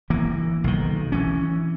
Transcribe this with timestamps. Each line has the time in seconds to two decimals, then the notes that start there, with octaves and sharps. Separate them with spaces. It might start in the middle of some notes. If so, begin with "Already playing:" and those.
0.10 E3 A#3
0.64 B1 D#3
1.12 E3 C#4